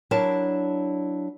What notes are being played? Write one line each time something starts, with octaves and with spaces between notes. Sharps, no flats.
F#3 D4 E4 A#4 A5